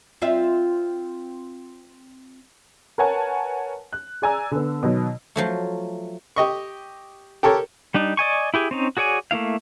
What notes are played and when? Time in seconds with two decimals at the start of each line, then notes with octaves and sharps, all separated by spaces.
0.22 C4 F4 E5
2.98 A#4 B4 C#5 F#5 G#5 A5
3.93 F#6
4.22 G#4 D5 G#5 A#5 E6
4.51 D3 B3
4.83 B2 D#3 F#3
5.36 F3 F#3 A3
6.36 G4 D#5 C#6
7.43 G4 A4 A#4 C#5
7.94 G3 D4 D#4
8.17 D5 D#5 G#5 C#6
8.54 E4 G4 G#4
8.71 C4 C#4 D#4
8.97 F#4 G#4 C#5 D5 G#5
9.31 A3 A#3 E4 F5